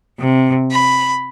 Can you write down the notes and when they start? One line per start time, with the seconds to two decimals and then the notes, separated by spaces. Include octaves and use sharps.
0.20 C3
0.71 B5